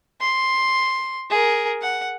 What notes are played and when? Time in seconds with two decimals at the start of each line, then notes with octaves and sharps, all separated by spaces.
0.21 C6
1.30 G#4 A#4
1.82 F#5